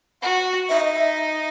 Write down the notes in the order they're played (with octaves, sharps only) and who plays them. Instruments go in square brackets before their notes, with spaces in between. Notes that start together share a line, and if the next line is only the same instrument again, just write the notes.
[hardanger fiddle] F#4 [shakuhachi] F#5
[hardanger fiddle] D#4 [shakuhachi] E5
[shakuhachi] D#5
E5